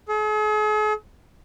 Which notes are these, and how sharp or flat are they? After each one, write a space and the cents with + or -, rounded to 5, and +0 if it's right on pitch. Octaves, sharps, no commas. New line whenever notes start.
G#4 +45